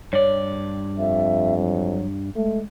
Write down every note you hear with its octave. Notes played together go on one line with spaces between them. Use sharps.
G2 C#5 D5
F2 E5
F#3
G#3 A3